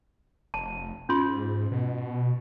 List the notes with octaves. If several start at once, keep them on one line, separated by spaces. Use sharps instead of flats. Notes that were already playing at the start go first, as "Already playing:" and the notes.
F1 A5
G#2 C#4 F4 C6
B2